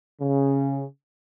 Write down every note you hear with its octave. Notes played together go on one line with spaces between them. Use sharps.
C#3